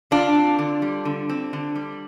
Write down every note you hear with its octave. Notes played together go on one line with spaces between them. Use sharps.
D3 D4 F4
C4
D3
G3
D3
C4
D3
G3